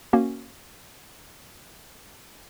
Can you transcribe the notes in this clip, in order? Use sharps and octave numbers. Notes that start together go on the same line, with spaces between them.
A#3 C#4 F#4